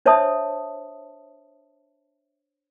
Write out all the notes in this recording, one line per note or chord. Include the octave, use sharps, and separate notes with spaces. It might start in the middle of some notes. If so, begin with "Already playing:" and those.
D4 C5 C#5 E5 A5 D#6